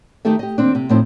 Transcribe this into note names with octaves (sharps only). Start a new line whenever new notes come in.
D#3 A3 D#4 G4 A4 E5
G4 D#5
D#2 C4 D4
C3
F2 A2 F3 C4 D#4 C5